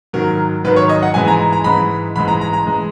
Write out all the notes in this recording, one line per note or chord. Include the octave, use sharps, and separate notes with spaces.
G#2 D#3 F#3 A#4
G#2 D#3 F#3 B4
C#5
D#5
F#5
G#2 E3 G#3 G#5
A#5
A#5
G#2 E3 G#3 B5
G#2 E3 G#3 B5
A#5
A#5
A#5
E3 G#3